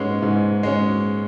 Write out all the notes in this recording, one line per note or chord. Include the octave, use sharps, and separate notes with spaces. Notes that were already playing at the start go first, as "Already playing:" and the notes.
Already playing: G#2 G#3 C#4 B4
G#2
G#3 C#4